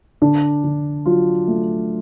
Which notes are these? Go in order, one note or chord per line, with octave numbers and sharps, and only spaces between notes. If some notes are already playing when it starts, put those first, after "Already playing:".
D3 D4
D3
F#3 F4
A3